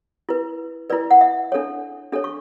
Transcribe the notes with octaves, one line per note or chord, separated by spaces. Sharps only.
E4 B4
E4 B4 D5
F#5
E5
D4 A4 C#5
D4 A4 C#5
C#6